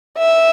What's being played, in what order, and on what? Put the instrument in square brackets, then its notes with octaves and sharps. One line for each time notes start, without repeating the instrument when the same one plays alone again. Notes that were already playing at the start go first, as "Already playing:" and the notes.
[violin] E5